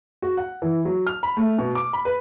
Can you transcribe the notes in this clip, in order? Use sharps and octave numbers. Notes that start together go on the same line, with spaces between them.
F#4
F#5
E3
F#3
F6
B5
A3
B2
D6
B5
B4